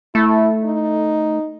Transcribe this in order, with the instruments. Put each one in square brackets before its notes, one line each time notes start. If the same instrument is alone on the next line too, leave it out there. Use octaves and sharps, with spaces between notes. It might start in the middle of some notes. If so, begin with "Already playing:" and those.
[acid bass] A3 [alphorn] E4
[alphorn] D#4